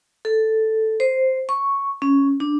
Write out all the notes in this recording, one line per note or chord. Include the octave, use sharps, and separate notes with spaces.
A4
C5
C#6
C#4
D4